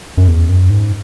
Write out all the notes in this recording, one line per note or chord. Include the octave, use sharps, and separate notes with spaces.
F#2
E2
F#2
G#2